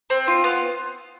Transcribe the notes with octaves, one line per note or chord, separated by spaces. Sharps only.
C4
F4
B3